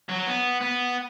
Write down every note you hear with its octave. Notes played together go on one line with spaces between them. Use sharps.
F#3
B3
B3